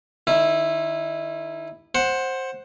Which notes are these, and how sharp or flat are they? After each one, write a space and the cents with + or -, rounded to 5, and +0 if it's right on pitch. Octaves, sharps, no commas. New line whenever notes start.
D#3 -25 E4 +0
C5 +15 F#5 +0